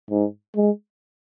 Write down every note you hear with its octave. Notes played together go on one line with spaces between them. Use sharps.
G#2
G#3